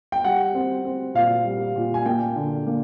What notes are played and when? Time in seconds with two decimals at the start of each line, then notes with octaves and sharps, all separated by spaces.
0.12 G5
0.24 G3 F#5
0.55 C4
0.85 C4
1.14 A#2 F5
1.45 G3
1.76 A#2
1.94 G#5
2.06 A#3 G5
2.36 D3
2.67 A#3